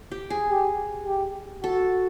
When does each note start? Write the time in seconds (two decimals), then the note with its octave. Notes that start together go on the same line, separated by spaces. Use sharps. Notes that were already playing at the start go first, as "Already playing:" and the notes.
Already playing: A4
0.12 G4
0.30 G#4
0.50 G4
1.06 G4
1.63 F#4 A4